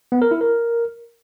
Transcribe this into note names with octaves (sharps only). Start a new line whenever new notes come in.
B3
A#4
E4
A#4